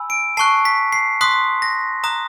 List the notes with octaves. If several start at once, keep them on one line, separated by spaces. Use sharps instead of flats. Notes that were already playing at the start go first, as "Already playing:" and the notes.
Already playing: G#5 B5 E6
D7
A5 C#6 F#6 C7
B6
C7
C6 D#6 F#6 B6
A#6
A#5 D#6 F#6